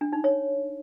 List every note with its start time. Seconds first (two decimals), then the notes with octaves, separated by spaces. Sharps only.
0.01 D4
0.13 D#4
0.24 C#5